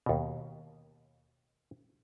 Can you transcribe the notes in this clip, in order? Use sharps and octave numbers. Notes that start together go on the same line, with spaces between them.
D#2 B2